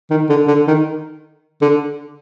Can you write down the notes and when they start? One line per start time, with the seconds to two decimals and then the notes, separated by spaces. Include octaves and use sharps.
0.10 D#3
0.29 D3
0.47 D3
0.67 D#3
1.61 D3